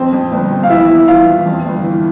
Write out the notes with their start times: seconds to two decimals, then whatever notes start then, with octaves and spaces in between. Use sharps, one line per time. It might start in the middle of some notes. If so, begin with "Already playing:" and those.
Already playing: F2 C4 C5
0.12 F2
0.31 G1
0.51 F2
0.63 F5
0.70 E2 E4 E5
0.88 E3
1.07 E3 F4 F5
1.27 E3
1.46 F2
1.65 G1
1.83 E3